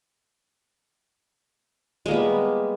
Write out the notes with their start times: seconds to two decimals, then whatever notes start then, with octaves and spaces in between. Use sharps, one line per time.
2.06 G#3
2.08 A#3
2.11 G3
2.13 B3